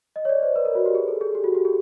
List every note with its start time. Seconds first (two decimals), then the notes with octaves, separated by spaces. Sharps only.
0.16 D#5
0.25 C#5
0.29 D5
0.43 C5
0.56 B4
0.65 A#4
0.75 F#4
0.86 G4
0.95 G#4
1.08 A4
1.21 G#4
1.35 G4
1.44 F#4
1.55 G4
1.65 G#4